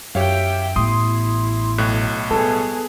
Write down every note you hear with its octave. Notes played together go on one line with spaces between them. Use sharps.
F#2 G4 C#5 E5 F5 G5
A1 B3 E4 C6 D#6
B1 A2 F#6
G3 B3 G#4 A4